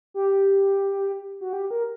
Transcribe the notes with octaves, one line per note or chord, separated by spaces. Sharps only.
G4
F#4
G4
A#4